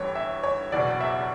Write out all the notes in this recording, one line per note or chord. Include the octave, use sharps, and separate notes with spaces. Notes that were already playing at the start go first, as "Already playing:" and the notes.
Already playing: G1 G2 E3 C#5
E5
C#5
F#1 E2 B2 D5
E5